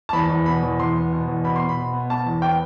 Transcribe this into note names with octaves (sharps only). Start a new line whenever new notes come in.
A5
E2 B5
E2
B2 B5
E2
E2 C6
B3
B2
E2
B2 B5
C6
B2
B5
B2
B3
B3 A5
E2
B3 G5